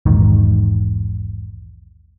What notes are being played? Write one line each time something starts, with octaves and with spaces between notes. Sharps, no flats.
A#1 E2 G#2 D#3